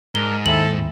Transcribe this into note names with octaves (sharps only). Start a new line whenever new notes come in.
G#2 D4 A#4 G7
D#2 C4 E4 A4 F#7